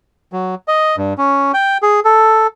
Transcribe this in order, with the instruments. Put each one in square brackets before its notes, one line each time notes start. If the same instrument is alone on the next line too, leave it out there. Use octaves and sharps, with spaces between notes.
[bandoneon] F#3
D#5
G2
C#4
G5
G#4
A4